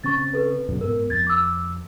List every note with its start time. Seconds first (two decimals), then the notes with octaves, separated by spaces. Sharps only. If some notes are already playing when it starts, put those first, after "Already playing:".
0.04 C#3 C4 C#4 C#6 A6
0.33 A4 B4
0.68 F#2 B2
0.81 G#2 B3 A#4
1.10 F2 G#6 A6
1.27 D6 E6